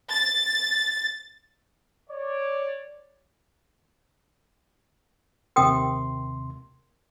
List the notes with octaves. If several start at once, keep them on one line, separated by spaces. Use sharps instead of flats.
A6
C#5 D5
D#2 C3 A#4 G5 C6 D#6